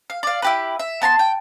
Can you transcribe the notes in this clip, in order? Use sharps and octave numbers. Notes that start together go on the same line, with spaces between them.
F5
D5 F5
E4 G4 B4
E5
B3 A5 A#5 C6
G5